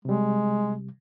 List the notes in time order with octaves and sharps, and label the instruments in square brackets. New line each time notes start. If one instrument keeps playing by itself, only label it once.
[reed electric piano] C3 G3 [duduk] G#3